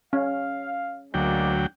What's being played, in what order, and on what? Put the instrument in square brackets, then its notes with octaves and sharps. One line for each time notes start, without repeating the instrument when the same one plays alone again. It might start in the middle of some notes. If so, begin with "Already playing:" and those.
[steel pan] C#4 [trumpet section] F5
[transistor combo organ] D2 F#3 G5 [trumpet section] G#3 A#3 D5